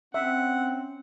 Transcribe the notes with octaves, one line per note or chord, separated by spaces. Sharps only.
C4 C#4 E5 F#5